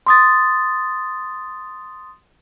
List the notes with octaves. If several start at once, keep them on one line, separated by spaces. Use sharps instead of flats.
C6 D#6 A6